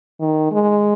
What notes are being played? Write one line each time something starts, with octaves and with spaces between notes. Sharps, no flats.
D#3
G#3